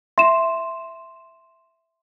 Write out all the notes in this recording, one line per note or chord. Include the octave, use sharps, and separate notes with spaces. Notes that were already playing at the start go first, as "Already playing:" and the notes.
E5 C6 E7